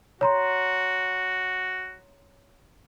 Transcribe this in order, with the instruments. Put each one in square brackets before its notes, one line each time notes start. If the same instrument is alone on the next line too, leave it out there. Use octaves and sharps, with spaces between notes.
[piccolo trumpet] F#4 [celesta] C#5 A#5 C6